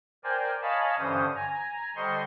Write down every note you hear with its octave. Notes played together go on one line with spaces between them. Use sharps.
A#4 C5 D5 G5 G#5
C#5 D#5 F5 G#5 A5 B5
G2 D3 E3 C#4 C5 D#6
G#5 A#5
D3 G3 C5 D#5 C6 C#6